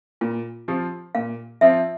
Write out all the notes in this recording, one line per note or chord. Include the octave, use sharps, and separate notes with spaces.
A#2 F4
F3 C4 F4 G4
A#2 F5
F3 C4 F4 E5